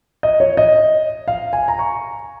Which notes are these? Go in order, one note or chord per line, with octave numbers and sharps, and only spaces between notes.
D#5
C#5
D#5
F5
G#5
A#5
C#6